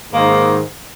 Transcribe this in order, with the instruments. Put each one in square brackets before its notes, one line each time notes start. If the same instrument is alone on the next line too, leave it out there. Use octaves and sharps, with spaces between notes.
[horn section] G#2 D#3 A#3